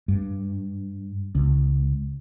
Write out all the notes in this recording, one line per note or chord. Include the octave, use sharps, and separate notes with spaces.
G2
C#2